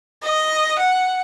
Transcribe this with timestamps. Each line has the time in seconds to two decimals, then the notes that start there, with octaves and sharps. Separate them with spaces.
0.23 D#5
0.79 F#5